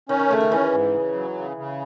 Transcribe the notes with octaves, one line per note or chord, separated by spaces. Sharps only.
D#3 C#4
D#3
C#3 A3
D#3
E3 C#4
G#2
C#3
F#3
C#3
C#3